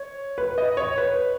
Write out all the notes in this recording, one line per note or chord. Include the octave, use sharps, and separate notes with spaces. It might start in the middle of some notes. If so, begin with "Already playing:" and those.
Already playing: C#5
B4
D#5
C#5
B4